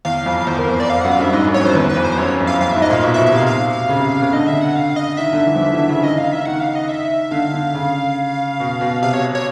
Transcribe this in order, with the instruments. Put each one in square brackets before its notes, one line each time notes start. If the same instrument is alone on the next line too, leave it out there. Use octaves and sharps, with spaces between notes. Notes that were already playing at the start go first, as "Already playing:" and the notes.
[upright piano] E2 [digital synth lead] F5
[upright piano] F2
[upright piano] E2 [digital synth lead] C5
[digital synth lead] A#4
[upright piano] F2 [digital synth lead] C5
[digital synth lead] D5
[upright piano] F2 [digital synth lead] F5
[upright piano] F#2 [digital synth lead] F#5
[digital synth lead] F5
[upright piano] G2 [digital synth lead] E5
[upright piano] G#2 [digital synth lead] D#5
[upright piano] F#2
[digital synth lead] C#5
[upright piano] F2 [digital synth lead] C5
[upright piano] E2 [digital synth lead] B4
[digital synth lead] B4
[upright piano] F2
[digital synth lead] C5
[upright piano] F#2 [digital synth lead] C#5
[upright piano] F2
[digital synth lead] F5
[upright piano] F2 [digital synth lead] F5
[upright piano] G#2 [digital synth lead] E5
[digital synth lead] D#5
[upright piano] A#2 [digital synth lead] F5
[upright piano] B2 [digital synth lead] E5
[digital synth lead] E5
[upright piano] B2
[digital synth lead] E5
[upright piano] C3 [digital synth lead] F5
[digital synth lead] F5
[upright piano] C#3
C3
C#3
[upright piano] D3 [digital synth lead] D#5
[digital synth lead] E5
F#5
F5
D#5
[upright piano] D#3 [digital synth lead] E5
[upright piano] D3
E3
F3
E3
D3
C#3
[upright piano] D#3 [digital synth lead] D#5
[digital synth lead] F5
[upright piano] D#3
[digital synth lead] E5
[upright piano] D#3 [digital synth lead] F#5
[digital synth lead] F5
D#5
E5
[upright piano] D3 [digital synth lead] F5
[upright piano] D3
C#3
B2
B2
[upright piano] C3 [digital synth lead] F5
[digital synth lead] C#5
C#5